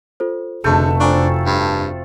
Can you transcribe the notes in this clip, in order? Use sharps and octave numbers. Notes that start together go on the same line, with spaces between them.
F4 A4 C5
F1 B2 D3 A3 G#4 A4 A5 G6
C4 D4 F4 G#5 A#5 C#6
G2